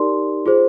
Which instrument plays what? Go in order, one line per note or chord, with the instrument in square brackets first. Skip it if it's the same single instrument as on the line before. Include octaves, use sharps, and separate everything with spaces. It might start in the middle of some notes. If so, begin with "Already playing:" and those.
Already playing: [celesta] D#4 G4 A#4 D5 C6
F4 G#4 C5